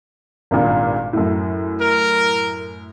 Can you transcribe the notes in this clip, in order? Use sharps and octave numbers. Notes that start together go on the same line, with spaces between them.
G#1 G2 A#2
F#2 A2
A#4